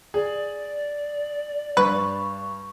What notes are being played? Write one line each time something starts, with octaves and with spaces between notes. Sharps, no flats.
G#4 D5
G2 B4 C#6